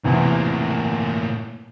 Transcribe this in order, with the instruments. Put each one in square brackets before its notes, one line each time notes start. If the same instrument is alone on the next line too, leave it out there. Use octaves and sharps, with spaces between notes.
[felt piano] E2 C3 E3 [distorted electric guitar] A2 A#3